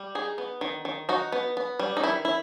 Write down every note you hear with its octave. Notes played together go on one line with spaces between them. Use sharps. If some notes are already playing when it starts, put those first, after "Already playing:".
Already playing: G3
D#4 G#4
B3
D#3
D#3
D#4 F#4
B3
B3
G3
D#4
D#3 E4
E4